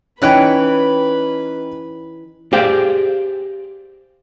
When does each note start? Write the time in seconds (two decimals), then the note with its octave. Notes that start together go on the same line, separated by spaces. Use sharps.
0.22 E3 C#4 D#4 B4 C#5 G5 B5 F#6
2.53 G4 G#4 C5 D5 F5 G5